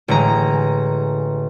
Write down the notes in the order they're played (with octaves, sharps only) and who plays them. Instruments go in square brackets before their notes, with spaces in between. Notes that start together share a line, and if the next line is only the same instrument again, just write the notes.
[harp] A1 D3 G#3 A#5